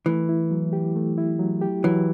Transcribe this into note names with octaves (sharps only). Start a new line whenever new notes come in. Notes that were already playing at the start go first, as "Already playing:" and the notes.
E3 A3
E4
F#3
G4
A3
E4
F#3
G4
E3 F#3